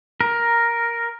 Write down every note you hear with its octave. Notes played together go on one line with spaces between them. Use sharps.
A#4